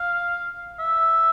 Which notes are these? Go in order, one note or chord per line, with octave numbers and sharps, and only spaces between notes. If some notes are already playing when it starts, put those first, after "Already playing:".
Already playing: F5
E5